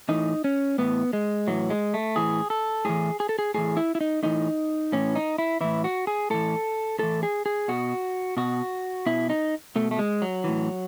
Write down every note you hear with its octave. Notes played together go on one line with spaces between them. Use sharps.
A2 E3 D#4
C#4
A2 E3 B3
G#3
A2 E3 F#3
G#3
A3
A2 E3 G#4
A4
A2 E3 G#4
G#4
A4
G#4
A2 E3 G#4
E4
E4
D#4
A2 E3 D#4
A2 E3 C#4
D#4
E4
A2 E3 E4
F#4
G#4
A2 E3 A4
A2 E3 A4
G#4
G#4
B2 F#4
B2 F#4
B2 E4
D#4
B2 A3
A3
G#3
F#3
A2 E3